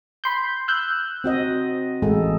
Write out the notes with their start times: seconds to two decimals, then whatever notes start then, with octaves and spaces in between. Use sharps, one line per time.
0.24 B5 C6 G6
0.68 E6 F#6 G6
1.24 C4 F#4 D#5
2.02 A1 G#3 A4